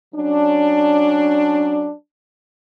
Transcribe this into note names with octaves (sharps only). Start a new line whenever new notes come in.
F#3 C#4 D4